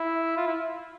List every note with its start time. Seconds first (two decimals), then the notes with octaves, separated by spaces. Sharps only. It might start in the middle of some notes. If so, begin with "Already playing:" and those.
Already playing: E4
0.37 F4
0.47 E4